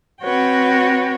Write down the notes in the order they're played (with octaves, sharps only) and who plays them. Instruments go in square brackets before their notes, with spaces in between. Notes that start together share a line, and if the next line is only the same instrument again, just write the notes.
[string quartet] C4 F#4 B4 C#5 G5